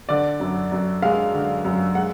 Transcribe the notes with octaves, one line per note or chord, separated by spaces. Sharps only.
D3 D5
F#2
F#2
G#3 F5
D3
F#2
G#3 F#5